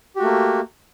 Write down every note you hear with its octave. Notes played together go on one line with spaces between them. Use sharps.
A3 A#3 F#4 G4